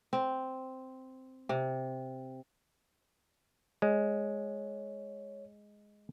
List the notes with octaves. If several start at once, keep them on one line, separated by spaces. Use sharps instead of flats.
C4
C3
G#3 C#5